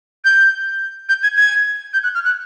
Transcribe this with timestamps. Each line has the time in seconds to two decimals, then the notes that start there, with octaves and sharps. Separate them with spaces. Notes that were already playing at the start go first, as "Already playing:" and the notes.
0.25 G6
1.09 G6
1.23 G#6
1.37 G#6
1.94 G6
2.04 F#6
2.15 F6
2.25 F#6